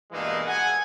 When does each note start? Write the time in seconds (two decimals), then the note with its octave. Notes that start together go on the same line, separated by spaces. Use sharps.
0.12 G2 B2 E3 G#3 A#3 D#4
0.46 G#4 F#5 G#5